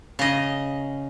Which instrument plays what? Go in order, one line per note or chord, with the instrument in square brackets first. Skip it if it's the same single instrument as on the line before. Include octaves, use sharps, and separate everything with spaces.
[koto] C#3 D#5